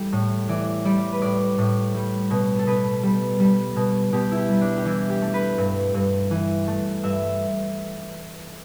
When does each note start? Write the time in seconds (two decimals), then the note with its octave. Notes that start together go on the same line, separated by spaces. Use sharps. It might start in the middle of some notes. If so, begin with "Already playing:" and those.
Already playing: E3 G3 G4 A4
0.12 A2
0.48 E3 D5
0.85 G3 D5
1.12 B4
1.22 A2 D5
1.58 A2
1.95 G3
2.31 B2
2.59 A4
2.67 B2 B4
3.03 G3
3.40 G3
3.76 B2
4.12 B2 G4
4.31 E4
4.37 G4
4.49 G3
4.61 D4
4.77 G4
4.85 E3 E4
5.10 G4
5.22 A3
5.34 B4
5.58 G2
5.94 G2
6.31 E3
6.67 A3
7.03 G2 E5